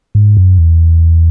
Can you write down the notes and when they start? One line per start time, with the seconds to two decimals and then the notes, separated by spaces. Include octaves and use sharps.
0.15 G#2
0.37 F#2
0.58 E2